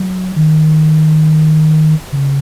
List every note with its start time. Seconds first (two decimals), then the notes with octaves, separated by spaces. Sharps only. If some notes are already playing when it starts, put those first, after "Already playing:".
Already playing: F#3
0.36 D#3
2.12 C#3